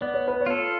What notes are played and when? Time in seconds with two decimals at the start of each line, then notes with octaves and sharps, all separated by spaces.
0.01 B3 D5
0.14 C#5
0.28 B4
0.41 C#5
0.46 F4 A4